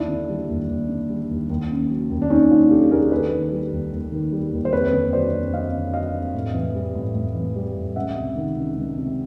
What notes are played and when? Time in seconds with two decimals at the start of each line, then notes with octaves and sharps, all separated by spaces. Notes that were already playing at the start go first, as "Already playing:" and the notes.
Already playing: D#2 D4 E4
0.08 D3
0.29 G3
0.49 D#2
0.69 D#2
0.89 D3
1.09 G3
1.29 D#2
1.50 D#2
1.70 C#3
1.90 F#3
2.10 D#2
2.22 D4
2.30 D#2 C#4 D#4
2.51 C#3 D#4 F4
2.71 F#3 G4 A4
2.91 D#2 G#4 A#4
3.11 D#2 A4 B4
3.32 D#3
3.52 G3
3.71 D#2
3.92 D#2
4.12 D#3
4.32 G3
4.53 D#2
4.65 C5
4.73 F2 B4 C#5
4.93 D3
5.13 F#3 C5 D5
5.33 F2
5.54 F2 D#5 F5
5.73 D3
5.93 F#3 D#5 F5
6.14 F2
6.34 A2
6.54 E3
6.75 G3
6.95 A2
7.15 A2
7.35 E3
7.56 G3
7.76 A2
7.96 C#2 E5 F#5
8.16 C3
8.36 D#3
8.56 C#2
8.77 C#2
8.97 C3